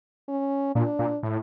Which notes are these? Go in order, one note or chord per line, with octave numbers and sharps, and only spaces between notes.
C#4
A#2 D4
A#2
A2